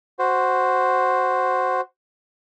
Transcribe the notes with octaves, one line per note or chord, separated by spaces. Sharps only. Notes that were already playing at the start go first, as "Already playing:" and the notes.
F#4 C5